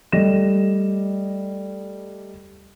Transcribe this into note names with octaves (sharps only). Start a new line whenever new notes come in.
G3 A3 D#5 A#6 E7